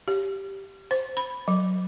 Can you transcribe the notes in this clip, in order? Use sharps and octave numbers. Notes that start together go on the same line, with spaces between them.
G4
C5
B5
F#3